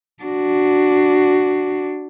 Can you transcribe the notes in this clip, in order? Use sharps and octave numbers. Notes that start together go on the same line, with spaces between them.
D4 F#4